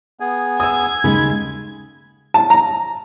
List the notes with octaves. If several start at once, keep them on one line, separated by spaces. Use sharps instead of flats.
B3 G#4 G#5
D#6 E6 G#6
D#2 C#3 G#3 B5
A5
A#5